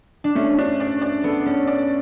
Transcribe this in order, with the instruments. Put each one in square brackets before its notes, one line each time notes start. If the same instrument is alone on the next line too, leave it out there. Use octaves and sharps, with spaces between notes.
[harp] D4
[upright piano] A3 [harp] C#4
[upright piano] D4
D5
D5
[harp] B3 [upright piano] A4
[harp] C#4 [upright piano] A4
[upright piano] D5